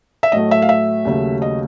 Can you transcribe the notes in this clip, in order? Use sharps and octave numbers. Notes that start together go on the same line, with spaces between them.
E5
A2 F#3 A3 D#5
E5
F5
E5
D#2 C#3 F#3 A3
D#5